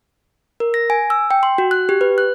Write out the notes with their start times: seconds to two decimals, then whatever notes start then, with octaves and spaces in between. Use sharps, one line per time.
0.60 A#4
0.74 A#6
0.90 G#5
1.10 E6
1.31 G5
1.43 C6
1.58 F#4
1.71 F#6
1.89 G4
2.01 B4
2.18 F#6